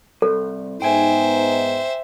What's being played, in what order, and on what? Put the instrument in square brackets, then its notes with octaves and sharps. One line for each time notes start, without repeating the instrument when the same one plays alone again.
[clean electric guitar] C2 [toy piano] A4
[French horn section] G#2 B3 D#4 [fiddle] C5 E5 [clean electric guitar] G5 G#5